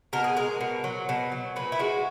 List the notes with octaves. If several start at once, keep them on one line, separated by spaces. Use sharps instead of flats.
B2 A#4
G#4
G#3 A#4
B2
F#3
B2
F#3
A#2 B4
E4
G#3 F#4